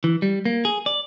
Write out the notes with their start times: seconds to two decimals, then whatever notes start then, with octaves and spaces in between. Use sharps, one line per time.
0.04 E3
0.22 G3
0.45 A#3
0.65 G#4
0.86 D5